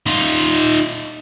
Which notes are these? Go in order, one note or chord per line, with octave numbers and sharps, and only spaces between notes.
D#4 F4